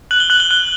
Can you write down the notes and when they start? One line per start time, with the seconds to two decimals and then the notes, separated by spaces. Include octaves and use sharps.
0.11 F#6 F#7
0.20 G7
0.30 F#6 F#7
0.40 G7
0.51 F#6 G7